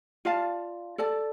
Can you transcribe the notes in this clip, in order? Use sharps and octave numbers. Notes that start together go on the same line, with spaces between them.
F4 D5 F5 A5
A4 D5 A5